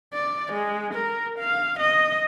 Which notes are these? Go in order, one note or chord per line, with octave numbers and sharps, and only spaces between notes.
D5
G#3
A#4
F5
D#5